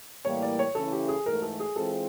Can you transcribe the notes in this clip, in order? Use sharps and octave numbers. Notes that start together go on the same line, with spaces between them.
A2 E3 G3 A#3 C#5
D5
C#5
C#3 E3 A3 C#4 E4 A4
G4
G#4
G#2 E3 A3 A#4
A4
G#4
E3 G#3 C4 F4 G#4 A4